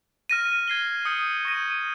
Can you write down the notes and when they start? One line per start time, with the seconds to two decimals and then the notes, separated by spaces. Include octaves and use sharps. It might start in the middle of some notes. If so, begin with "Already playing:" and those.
0.30 F6 A#6 D#7
0.68 G#6 C7 G7
1.05 D#6 G6 C#7 G7
1.45 C#6 G6 A#6 D#7